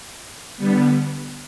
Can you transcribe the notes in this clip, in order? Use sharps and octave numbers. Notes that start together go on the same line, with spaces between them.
D3 G3 B3